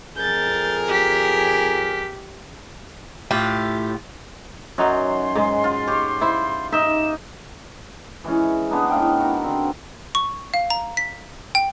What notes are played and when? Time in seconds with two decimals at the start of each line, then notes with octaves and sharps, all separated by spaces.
0.16 F2 G#4 A#4 G6 A6
0.88 G4 B6
3.31 A2 F4 G4
4.78 F#2 F#3 D#4 F#4 C6
5.35 G#2 G#3
5.64 F4
5.87 G4 C#5
6.21 E4 C5
6.72 D#4 D#5 E5 E7
8.24 E3 G#3 C#4
8.71 G#3 B3 D4 D#4
8.90 A2 F5 G5
9.19 F#4 A#4
9.44 D3 C4
10.15 C#6
10.54 F5
10.70 A#5
10.97 B6
11.55 G5